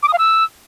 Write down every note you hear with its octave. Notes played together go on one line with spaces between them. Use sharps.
D6
D#6
F5
E6